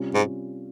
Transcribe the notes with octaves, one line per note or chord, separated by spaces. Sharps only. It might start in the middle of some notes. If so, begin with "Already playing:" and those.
Already playing: C3 G3 C#4 F4
G#2